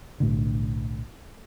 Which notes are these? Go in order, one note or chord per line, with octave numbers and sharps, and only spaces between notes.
B1 A2 D3